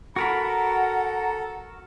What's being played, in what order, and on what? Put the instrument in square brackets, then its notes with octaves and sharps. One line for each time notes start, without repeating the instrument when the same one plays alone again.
[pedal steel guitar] F#4 A#4 B5 [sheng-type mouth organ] A4 [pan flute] F#5 [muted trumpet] A#5